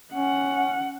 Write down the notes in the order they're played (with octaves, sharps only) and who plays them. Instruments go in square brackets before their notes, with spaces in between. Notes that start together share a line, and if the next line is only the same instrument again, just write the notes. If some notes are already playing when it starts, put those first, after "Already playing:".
[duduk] C#4 [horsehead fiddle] F#5